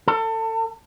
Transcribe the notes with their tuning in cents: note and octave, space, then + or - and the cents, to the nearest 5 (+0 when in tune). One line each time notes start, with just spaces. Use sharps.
A4 +30